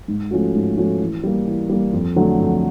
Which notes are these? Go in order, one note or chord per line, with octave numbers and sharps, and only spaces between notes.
G#2
F3 A3 C#4 F#4
G#2
F3 A3 C#4 F#4
E3
G3 A#3
E3
G3 A#3
F2
D3 F#3 A3
F2